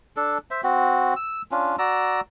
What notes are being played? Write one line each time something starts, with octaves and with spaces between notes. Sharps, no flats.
D4 A4
C5 E5
C4 F#4
E6
C#4 D4 F4
F#4 D5 A#5 E6